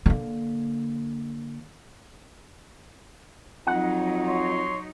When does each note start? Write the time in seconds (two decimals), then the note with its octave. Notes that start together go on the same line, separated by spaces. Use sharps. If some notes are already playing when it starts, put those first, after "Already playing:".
0.06 D3 A#3
3.67 F2 F#3 D#4 F#5
4.27 C#5 C6